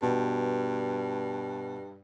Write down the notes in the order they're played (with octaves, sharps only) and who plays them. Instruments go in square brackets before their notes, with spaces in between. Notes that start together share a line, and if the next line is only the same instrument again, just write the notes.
[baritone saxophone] G2 [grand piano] B2